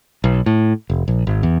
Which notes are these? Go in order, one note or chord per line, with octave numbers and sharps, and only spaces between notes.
B1
A2
F1
A#1
G#1
E2